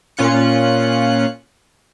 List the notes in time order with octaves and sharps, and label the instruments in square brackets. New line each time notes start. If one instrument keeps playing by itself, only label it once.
[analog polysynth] A#2 C#4 F4 F#6 C#7